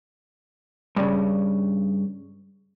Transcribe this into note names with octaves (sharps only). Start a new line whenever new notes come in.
G2 C#3